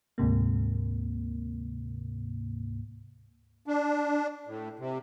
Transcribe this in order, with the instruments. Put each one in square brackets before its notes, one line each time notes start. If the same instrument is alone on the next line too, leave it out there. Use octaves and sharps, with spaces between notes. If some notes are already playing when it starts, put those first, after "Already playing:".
[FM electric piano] D2 G#2 C3 A#3
[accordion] D4
A2
C3